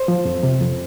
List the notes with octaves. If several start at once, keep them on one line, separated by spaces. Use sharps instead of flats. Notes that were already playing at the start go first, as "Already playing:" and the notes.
Already playing: C5
F3
F2
C3
F2